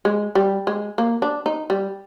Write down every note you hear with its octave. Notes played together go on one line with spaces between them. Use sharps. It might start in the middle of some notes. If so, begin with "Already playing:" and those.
G#3
G3
G#3
A#3
D4
D#4
G3